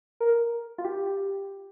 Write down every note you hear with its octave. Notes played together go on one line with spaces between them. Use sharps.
A#4
F4
G4